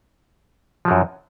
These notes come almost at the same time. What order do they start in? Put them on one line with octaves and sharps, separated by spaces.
F3 F#3 F#2